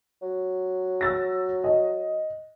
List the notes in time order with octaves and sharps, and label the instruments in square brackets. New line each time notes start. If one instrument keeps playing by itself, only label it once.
[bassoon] F#3
[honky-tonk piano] E6 A6 A#6
D#5